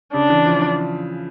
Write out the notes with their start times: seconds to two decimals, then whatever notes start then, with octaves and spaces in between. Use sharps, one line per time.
0.13 C#3 D4
0.30 E3
0.46 F3